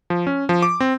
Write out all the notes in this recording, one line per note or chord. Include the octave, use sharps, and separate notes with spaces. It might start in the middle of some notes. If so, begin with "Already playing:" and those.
F3
C#4
F3
D6
C4